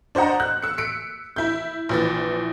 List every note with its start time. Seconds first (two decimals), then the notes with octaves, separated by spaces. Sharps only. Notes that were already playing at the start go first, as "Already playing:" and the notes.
0.15 D4 C5 D#5 F#5 A#5
0.40 F#6
0.62 E6 C#7
0.78 B6 C#7 D7
1.36 E4 G6
1.89 A#1 E3 A6